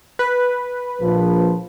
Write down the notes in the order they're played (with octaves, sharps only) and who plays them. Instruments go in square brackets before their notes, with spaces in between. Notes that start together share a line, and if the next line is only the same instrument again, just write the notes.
[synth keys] B4
[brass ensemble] A#1 F3